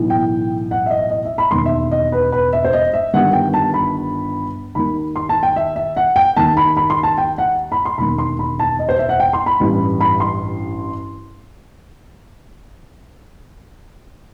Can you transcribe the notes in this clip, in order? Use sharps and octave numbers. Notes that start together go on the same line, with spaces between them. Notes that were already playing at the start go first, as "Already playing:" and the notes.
Already playing: B1 A2 E3
G5
F#5
E5
D#5
D#5
E5
B5
E1 D#2 D#3 C6
E5
D#5
B4
B4
E5
C5
D#5
E5
G1 G2 D#3 F#5
G5
A5
B5
D#2 D#3 B5
C6
A5
G5
E5
E5
F#5
G5
D#2 D#3 A5
B5
B5
C6
A5
G5
F#5
B5
C6
E1 D#2 D#3 B5
C6
B5
A5
D#5
C5
E5
F#5
G5
C6
B5
A1 G2 E3
B5
C6